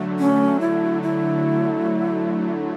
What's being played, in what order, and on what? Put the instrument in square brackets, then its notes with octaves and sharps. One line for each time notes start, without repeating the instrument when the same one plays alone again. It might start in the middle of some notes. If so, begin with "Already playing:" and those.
Already playing: [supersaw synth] D3 F#3 A3
[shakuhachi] C#4
E4
E4